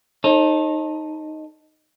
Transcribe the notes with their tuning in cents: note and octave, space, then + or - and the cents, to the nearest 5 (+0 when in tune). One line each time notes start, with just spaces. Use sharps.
D#4 +0 A4 +0 C#5 -45